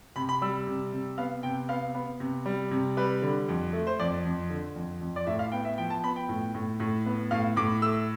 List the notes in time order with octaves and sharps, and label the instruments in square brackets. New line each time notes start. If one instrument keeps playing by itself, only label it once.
[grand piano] C3 B5
B5
G3 E6
C3
C3
B3 F5
C3 G5
B3 F5
B3
C3
G3
C3
G3 B4
D3
F2
A3
C5
F2 D5
F2
D3
F2
F2
D5
A2 E5
F5
B3 G5
E5
F3 G5
A5
B3 B5
G5
A2
A2
A2
B3
A2 F5
A2 D6
A3 E6